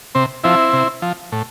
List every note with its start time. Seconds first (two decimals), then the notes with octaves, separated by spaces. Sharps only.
0.15 C3 C4
0.44 F3 C4 E4
0.73 C3
1.02 F3
1.32 A2